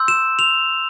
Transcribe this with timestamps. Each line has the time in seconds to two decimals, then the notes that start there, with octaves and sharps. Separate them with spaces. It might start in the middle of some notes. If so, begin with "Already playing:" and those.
Already playing: C6 E6 G6
0.08 E7
0.39 F7